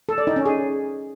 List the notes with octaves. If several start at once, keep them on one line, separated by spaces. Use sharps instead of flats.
A4
D5
D#4
C#4
G#4